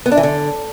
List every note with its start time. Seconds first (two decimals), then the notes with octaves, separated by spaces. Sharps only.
0.06 B3
0.12 D4
0.17 E3
0.23 D3